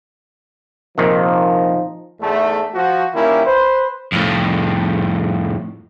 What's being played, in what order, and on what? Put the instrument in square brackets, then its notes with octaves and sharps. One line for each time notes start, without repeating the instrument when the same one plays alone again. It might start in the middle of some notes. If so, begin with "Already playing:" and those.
[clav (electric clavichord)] A#1 C3 D#3 [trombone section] F3 D#4
[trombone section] E2 G#2 A3
F3 F#4
D#3 G3 A#3 C#4 E4
B4 C5
[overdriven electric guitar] F2 A2